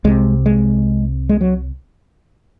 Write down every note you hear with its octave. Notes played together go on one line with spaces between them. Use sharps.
C2 C3 G#3
G#3
G#3
F#3